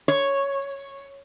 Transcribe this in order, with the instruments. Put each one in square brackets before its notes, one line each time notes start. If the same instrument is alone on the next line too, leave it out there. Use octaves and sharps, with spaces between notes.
[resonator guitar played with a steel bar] C#5